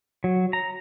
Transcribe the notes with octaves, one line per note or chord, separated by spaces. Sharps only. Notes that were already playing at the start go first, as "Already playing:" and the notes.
F#3
A#5